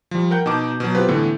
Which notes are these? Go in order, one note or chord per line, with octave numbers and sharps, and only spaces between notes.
F3 G3
A#4 F#5 G5 G6
B2 D#4 A5 D6
B2 F#3
B3 C4 F4 G4 B4
A2 D3 E3 A3 B3